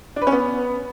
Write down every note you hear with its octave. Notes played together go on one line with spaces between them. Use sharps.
D4
B4
C#4
B3